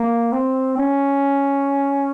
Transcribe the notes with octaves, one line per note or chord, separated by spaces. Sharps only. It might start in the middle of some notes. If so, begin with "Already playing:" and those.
Already playing: A#3
C4
C#4